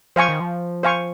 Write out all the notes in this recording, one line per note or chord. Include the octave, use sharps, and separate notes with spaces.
F3 C5 F5 G#5 C#6
D#3
F3
C5 F5 G#5 C#6